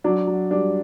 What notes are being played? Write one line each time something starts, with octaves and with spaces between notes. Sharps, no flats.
F#3 D4
F#3
G3 D4